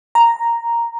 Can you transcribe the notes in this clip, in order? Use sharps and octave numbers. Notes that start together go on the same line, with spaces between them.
A#5